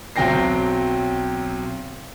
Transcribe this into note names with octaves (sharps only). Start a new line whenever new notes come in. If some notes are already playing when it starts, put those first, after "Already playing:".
B1 F#3 C4 G5 A#6 C7